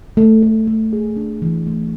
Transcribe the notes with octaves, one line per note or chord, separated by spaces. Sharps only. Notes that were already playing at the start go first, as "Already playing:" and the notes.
A3
A3
A3
G#4
D4
E3
A3